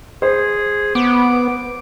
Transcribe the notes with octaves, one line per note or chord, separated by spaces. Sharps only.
G#4 C5
B3 D6